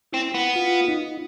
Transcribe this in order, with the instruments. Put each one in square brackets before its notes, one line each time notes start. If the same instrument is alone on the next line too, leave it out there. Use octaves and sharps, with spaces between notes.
[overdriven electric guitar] C4 [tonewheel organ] E4
[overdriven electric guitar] B3
[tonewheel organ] F4
D#4